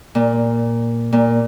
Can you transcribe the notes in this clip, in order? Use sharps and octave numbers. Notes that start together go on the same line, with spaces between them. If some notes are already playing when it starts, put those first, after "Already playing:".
A#2
A#2